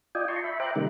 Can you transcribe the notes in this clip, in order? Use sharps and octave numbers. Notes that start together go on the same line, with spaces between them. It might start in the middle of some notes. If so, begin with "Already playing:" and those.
F4 D5 D#5 G5 G#5
A5 A#5 C6 C#6
E5 B5
C5 E5 G5 A#5 D6 F#6
C3 D#3 G3 A3 A#3 D#4